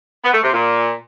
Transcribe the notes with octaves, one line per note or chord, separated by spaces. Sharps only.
B3
A3
C3
A#2